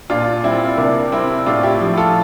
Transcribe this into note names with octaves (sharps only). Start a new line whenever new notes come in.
A#2 D4 F4
G3 C4 E4
C3 A#3 D4
G3 C4 E4
A2 D4 F4
E4 G4
F3
F4 A4